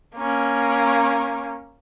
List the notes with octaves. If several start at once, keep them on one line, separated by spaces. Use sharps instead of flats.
A#3 C#4